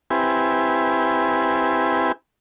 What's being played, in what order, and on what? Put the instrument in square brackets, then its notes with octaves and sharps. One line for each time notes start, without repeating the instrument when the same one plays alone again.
[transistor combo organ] C4 E4 G4 B4 G#5